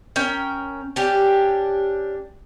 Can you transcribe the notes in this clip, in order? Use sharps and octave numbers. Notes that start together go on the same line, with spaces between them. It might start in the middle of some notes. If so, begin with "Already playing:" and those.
C#4 A#4 G5
C#4 D4 G4